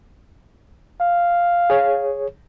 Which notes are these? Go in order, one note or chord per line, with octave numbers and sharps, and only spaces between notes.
F5
G#4 C#5